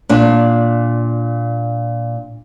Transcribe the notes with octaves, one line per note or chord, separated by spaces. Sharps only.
A#2 D4